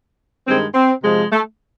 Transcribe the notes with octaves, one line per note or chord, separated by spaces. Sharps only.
G2 D#3 G#3 C4
C4
C3 F3 G#3
A3